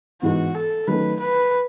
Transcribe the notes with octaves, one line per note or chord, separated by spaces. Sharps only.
G#2 E3 B3 F#4
A4
D#3 F#3 A3 C#4 B4
B4